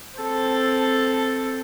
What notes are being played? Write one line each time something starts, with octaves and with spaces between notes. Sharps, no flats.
C4 A4